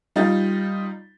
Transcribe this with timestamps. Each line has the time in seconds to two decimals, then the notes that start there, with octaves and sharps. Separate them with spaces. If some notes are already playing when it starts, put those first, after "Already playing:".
0.16 G3 D#4 F4 A6